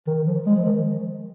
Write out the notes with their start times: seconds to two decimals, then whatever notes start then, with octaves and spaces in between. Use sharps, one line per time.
0.07 D#3
0.27 F3
0.46 G#3
0.56 F3
0.66 D#3